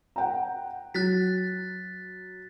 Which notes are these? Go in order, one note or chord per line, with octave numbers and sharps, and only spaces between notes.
F#5 G5 A#5
F#3 F#6 A6 B6